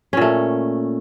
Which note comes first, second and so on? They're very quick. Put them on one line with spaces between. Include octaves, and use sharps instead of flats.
C#4 A#2 A3